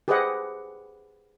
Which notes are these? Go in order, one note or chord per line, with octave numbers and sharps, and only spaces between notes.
G4 G#4 B4 C5 D#5 F#5